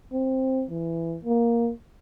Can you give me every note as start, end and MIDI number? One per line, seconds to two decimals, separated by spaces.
0.12 0.65 60
0.70 1.18 52
1.25 1.71 58